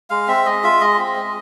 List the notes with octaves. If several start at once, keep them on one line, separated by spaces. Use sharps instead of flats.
G#3 F5
C4 E5
G#3 D#5
F4 E5
G#3 D#5
C4
G#3